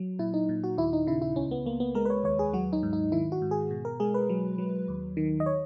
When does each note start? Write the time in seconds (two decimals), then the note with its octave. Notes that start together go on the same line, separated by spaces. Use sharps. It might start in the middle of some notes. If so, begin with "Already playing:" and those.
Already playing: F#3
0.19 A#2 E4
0.34 D#4
0.49 A#2
0.64 F#4
0.78 D#2 E4
0.93 D#4
1.07 C#3 E4
1.22 E4
1.36 C#2 C#4
1.51 B3
1.66 C#2 A#3
1.80 B3
1.95 G#3 A#4
2.05 B4
2.10 C#5
2.24 D#2 C#5
2.39 G#4
2.53 F#3 F#4
2.73 D#4
2.83 G#2
2.93 D#4
3.12 D#3 E4
3.32 F#4
3.42 G#2
3.51 G#4
3.71 B2
3.85 A#4
4.00 G#3 G#4
4.14 B4
4.29 F#3
4.58 F#3
4.88 D#2
5.17 D#3
5.40 D#5
5.46 C#5